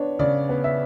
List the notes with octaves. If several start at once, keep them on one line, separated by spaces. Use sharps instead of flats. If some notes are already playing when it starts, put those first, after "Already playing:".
Already playing: B3 D4 C#5
C#3 D5
B3
E5